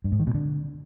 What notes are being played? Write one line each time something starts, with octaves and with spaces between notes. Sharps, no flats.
G2
G#2
D#3
B2
D3